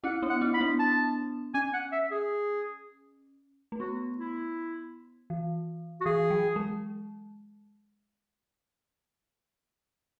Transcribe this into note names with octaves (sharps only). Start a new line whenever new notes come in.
C#4 E4 F#5
B3 D4
F#5
C#4 E4
B5
B3 D4
A5
C#4 G#5
F#5
E5
G#4
A3
B3 F#4
E4
E3
F#4
E3 G#4
F#3
G#3